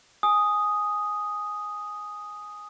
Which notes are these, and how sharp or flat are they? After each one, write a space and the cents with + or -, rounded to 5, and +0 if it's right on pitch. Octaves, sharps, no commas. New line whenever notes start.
G#5 +0 D#6 +0